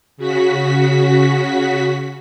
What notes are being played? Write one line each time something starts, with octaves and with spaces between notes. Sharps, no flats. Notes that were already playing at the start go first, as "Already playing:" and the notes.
C#3 F#4 B6